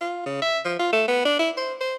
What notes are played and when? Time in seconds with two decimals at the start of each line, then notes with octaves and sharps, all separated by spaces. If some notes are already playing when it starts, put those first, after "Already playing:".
0.01 F4
0.26 C#3
0.42 E5
0.65 F3
0.79 F4
0.93 A3
1.08 B3
1.25 D4
1.39 E4
1.57 C5
1.81 C5